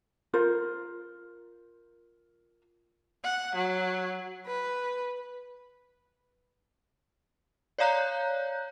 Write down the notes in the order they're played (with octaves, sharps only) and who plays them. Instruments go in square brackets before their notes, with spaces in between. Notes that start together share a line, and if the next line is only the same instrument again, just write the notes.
[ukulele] F4 A#4 C5
[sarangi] F#5
F#3
B4
[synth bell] C#5 D5 F5 A#5 F#6 G6